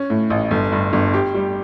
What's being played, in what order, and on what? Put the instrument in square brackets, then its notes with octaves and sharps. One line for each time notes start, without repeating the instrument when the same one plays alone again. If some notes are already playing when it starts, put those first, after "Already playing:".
Already playing: [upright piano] C#4
A2
A1
G1
G2
G1
G4
G3